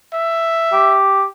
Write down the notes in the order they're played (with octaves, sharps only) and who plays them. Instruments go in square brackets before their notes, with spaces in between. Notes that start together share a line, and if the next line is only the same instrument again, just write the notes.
[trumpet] E5
[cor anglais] G4